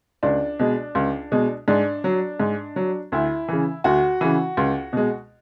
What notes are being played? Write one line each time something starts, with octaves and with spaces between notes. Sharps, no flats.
C#2 D4
B2 G#3
C#2
B2 G#3
G#2 D4
F#3
G#2
F#3
D2 E4
C#3 E3
D2 F#4
C#3 E3
C#2
B2 G#3